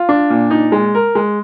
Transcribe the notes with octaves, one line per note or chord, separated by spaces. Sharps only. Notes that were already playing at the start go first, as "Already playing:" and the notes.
Already playing: F4
D4
A#2
D#4
G#3
A#4
G#3